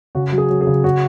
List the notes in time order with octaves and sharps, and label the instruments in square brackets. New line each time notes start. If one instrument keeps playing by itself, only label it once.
[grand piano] C#3 F#4
F#3
G#4
F#3
G#4
C#3
C#3 F#4